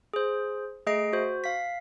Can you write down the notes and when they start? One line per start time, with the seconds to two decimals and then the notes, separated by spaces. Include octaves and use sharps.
0.14 G#4 C5
0.87 A3 G#4 D#5 C7 D7
1.13 F#4 C5
1.44 F5 B6